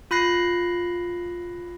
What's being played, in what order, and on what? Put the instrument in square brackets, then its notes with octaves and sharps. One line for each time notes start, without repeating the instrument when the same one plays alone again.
[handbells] F4 B5 F#6 A#6 C7